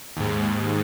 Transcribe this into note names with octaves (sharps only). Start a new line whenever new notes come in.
D#2 G#2